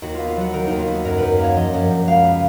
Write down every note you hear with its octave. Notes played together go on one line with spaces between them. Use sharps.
D#2 F#4
B3 F4
F4
F#3 F#4
D#3 A#4
D#2 D#4
F4
B3 F#4
F#2 A#4
F#2 B4
A#3 C#5
F3 D#5
F#2
F#2
C#2 F5
B3